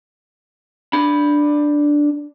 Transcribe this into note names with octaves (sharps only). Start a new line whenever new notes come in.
D4 B5